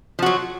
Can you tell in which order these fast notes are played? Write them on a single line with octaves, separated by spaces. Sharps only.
F3 F#4 F#3